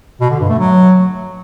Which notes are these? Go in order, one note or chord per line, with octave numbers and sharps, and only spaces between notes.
B2
D3
G2
A3
F#3